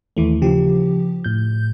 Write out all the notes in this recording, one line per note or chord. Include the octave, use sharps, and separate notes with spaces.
D#2 E3 A3
C#3 F3 G4
A2 G6